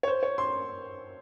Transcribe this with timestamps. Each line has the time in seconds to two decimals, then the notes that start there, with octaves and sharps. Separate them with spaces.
0.03 C#5
0.08 C5
0.23 C#5
0.38 C6